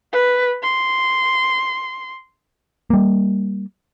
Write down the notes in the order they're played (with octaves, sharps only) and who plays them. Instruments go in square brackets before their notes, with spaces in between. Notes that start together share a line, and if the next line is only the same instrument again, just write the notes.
[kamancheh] B4
C6
[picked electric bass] G3 A#3